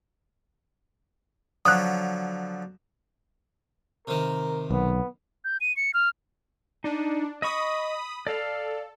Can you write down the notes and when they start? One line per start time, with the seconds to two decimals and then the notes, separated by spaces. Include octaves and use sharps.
1.65 D3 F3 F#3 D#6 F#6
4.07 C3 D#3 A#4
4.71 B1 B3
5.45 G6
5.61 D#7
5.77 C#7
5.94 F6
6.84 D4 D#4
7.42 D#5 B5 C#6 D#6
8.27 A4 D5 F5